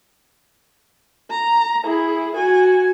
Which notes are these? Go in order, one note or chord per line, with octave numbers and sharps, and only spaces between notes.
A#5
E4 G#4
F#4 G#5